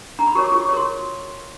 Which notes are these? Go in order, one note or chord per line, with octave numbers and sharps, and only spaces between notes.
D4 A#5
B5
F#4 A#4 C#5 C#6
D6
F4 C#6
D6
A#4 C#5 C6 C#6